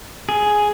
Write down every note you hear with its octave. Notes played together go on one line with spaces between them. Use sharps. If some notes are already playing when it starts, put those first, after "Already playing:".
G#4